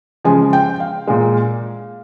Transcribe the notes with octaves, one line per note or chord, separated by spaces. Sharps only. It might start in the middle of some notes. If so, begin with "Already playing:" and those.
C#3 F3 G#3 G#5
G5
F5
A#2 G#3